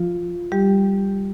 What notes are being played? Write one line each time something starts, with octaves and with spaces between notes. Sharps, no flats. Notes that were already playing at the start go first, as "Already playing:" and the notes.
Already playing: F3 F4
G3 G4